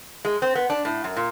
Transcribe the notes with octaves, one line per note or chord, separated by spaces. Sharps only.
G#3
C4
B3
D4
A2
F#2
A#2